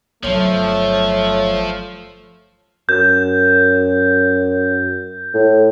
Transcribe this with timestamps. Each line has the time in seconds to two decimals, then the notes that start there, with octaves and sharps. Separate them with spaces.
0.23 G1 F3 F#3 A3 C#5
2.89 F#2 G6
5.34 A2